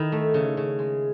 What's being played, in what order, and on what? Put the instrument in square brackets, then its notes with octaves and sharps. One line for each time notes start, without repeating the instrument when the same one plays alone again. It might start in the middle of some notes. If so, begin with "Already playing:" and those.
Already playing: [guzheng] D#3 E4
A3
C#3
C#3
G#3